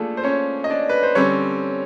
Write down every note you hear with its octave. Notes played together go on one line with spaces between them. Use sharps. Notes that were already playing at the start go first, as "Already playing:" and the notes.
Already playing: F3 A3 A#3 D4 G#4 A4
C5
C#4 C#5
D#5
D4 D5
B4
C5
D3 G3 C4 C#4 C#5